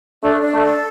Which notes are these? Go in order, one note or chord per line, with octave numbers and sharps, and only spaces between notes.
A3 D4
D4
A3
A4